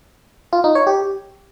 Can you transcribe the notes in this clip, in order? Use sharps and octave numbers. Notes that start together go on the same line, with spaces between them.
F4
D#4
C#5
G4